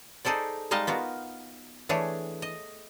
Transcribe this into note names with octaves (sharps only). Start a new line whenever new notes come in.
D#4 G#4 A4 C5 D5
G3 G#3 D#4 D#5 F5 A5
B3 F4 F#4 A#4
E3 A3 D4 G#4 C#5
D#5